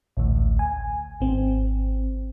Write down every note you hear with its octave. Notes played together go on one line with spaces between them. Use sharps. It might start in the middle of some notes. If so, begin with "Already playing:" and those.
A1 D2 A2
G#5
G#1 C4